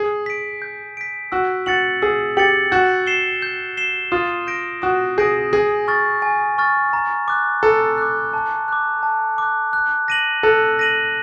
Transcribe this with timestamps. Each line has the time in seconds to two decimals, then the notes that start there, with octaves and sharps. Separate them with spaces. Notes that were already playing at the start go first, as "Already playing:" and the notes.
Already playing: G#4
0.26 B6 D7
0.62 G6
0.97 B6 D7
1.32 F#4 E6
1.66 F#4 A6 C#7 F#7
2.02 G#4 E6
2.37 G4 A6 C#7 F#7
2.72 F#4 G6
3.07 C7 E7 G7
3.42 G6
3.77 C7 E7 G7
4.12 F4 D#6
4.47 G6 A#6 D7
4.82 F#4 D#6
5.18 G#4 G6 A#6 D7
5.53 G#4 G#5
5.88 C#6 F6 A6
6.22 G#5
6.58 C#6 F6 A6
6.93 A#5
7.28 D6 F#6
7.63 A4 A#5
7.98 D6 F#6
8.33 A5
8.68 D6 F#6
9.03 A5
9.38 D6 F#6
9.73 F#6
10.08 A#6 D#7 F#7
10.43 A4 F#6
10.79 A#6 D#7 F#7